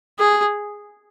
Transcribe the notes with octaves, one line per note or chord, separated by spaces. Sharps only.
G#4